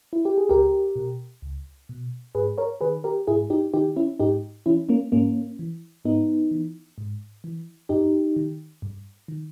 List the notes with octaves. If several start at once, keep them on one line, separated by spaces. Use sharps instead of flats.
E4
G4
G#4
C#2 G4 A#4
B2
C#2
B2
G#2 G#4 B4
A#4 C#5
D#3 G#4 B4
G4 A#4
G#2 E4 G#4
D#4 G4
D#3 D#4 G4
C#4 E4
G#2 D#4 G4
E3 C#4 E4
A#3 C#4
G#2 A#3 C#4
E3
G#2 B3 D#4
E3
G#2
E3
G2 D#4 G4
D#3
G2
D#3